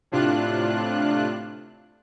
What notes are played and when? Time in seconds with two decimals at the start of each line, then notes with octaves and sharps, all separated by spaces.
0.12 A2 C3 D4 F4 F#6